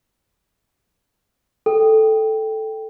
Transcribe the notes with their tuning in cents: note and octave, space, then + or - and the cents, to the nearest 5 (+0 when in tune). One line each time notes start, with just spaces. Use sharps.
A4 -5 G5 +0